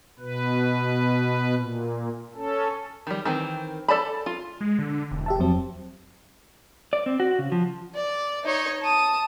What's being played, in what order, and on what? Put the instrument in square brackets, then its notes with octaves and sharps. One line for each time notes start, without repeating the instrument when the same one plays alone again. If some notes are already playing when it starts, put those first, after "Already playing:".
[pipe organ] B2 B4
A#2
C#4 A4
[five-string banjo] D#3 G3
D#3 E3 C4
A4 D5 A5 B5
F4
[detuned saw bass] G#3
D3
E1
[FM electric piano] G4 E5 A5
F2 F#3 C4
[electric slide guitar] D5
C4
F#4
C#3
F3
[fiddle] D5
D#4 C#5
A5 D#6